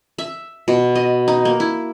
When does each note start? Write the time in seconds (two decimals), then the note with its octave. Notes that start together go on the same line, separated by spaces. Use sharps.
0.18 E5
0.68 B2
0.95 D#5
1.28 D#4
1.45 A#3
1.60 E4